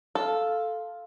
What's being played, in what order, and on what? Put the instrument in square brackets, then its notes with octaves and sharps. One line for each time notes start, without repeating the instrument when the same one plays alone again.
[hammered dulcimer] F4 [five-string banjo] A4